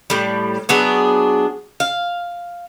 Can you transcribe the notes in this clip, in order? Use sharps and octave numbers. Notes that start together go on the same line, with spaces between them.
A2 G3
F#3 B3 D4 G#4
F5